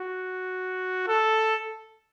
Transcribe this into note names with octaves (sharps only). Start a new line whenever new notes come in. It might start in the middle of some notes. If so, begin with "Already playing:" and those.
Already playing: F#4
A4